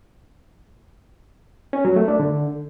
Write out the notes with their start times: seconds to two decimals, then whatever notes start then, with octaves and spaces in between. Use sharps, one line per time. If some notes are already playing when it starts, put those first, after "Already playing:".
1.73 C#4
1.85 F#3
1.96 A3
2.08 D4
2.20 D3